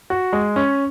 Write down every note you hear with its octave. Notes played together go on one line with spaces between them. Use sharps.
F#4
G#3
C#4